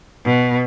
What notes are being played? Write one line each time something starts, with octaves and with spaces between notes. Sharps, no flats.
B2